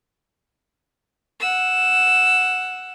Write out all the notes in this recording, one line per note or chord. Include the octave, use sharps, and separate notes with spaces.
F#5 E6